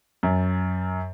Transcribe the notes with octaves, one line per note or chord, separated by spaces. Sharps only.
F#2